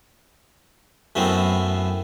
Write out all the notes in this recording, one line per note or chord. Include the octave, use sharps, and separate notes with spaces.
F#2 A2 A3 B3 C4